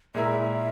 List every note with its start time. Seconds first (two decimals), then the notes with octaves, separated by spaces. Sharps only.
0.15 A#2 G#3 E4 A#4 E5